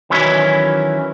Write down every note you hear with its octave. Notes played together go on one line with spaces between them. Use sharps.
D#3 E3 F#3 C#4 E4